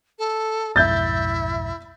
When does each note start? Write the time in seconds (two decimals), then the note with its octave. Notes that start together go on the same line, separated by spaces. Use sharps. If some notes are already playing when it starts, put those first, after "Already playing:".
0.19 A4
0.76 B1 F2 G#2 E4 E5 G6 A6